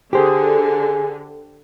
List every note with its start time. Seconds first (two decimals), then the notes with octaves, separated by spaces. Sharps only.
0.13 D3 G4 G#4 C5